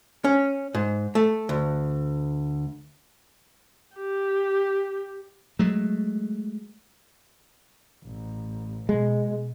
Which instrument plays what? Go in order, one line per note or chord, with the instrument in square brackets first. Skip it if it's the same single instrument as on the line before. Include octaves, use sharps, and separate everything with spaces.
[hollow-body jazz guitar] C#4
G#2
A3
D2
[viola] G4
[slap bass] F#3 G#3 A3
[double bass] A1
[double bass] B2 [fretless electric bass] G#3